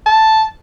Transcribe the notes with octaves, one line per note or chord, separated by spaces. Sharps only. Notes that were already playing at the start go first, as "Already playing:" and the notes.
A5